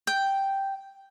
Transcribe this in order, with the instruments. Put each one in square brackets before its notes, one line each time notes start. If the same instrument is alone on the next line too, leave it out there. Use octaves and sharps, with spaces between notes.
[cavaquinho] G5